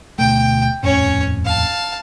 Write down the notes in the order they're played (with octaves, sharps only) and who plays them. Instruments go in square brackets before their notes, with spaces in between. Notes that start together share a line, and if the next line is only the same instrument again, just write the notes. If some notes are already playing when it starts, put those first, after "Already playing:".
[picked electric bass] D2 B2 A3 [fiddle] G5
[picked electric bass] D#1 F2 A2 [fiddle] C#4 C#5
[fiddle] F5 A5